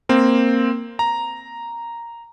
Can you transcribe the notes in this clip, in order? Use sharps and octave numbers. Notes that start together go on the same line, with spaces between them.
A#3 C4
A#5